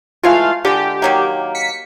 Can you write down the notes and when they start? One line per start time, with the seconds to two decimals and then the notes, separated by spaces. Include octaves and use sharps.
0.23 E3 G#3 A3 F4 F5
0.65 D3 G#3 G4
1.02 D#3 F#3 A#3
1.55 B6 C#7